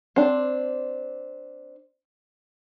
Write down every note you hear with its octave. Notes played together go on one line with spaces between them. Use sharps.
C4 D4